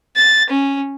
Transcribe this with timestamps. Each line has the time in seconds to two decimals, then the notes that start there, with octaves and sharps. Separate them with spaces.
0.16 A6
0.49 C#4